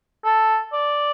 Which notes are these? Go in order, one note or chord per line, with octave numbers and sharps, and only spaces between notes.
A4
D5